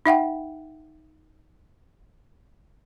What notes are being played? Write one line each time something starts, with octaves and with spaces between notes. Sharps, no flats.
D#4 E5 F#5 G5